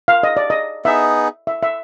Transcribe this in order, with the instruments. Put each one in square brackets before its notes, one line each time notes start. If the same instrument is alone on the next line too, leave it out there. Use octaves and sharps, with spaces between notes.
[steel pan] F5
D#5
D5
D#5
[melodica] B3 D#4 G#4 [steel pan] E5
[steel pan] E5
E5